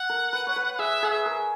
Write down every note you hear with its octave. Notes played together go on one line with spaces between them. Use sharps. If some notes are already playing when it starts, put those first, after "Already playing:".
Already playing: F#5
A#4
B4
C#5
B4
F#5
G#4 E5
G#4 F#5
E5
A#4